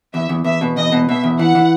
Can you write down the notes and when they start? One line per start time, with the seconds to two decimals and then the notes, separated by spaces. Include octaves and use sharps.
0.13 E2 E5
0.29 E2
0.44 E2 E5
0.61 B2
0.77 E2 D#5
0.92 B2
1.08 B2 E5
1.24 E2
1.39 E3 F#5
1.55 E3